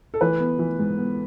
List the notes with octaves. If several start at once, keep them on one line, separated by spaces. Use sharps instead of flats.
A4
E3 B4
B3
E3
G#2
B3